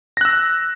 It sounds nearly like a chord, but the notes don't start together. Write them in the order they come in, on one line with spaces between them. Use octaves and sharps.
A#6 F#6 E6